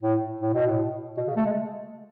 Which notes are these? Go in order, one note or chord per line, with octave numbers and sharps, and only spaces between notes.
A2
A2
B2
A2
B2
C#3
A3
G#3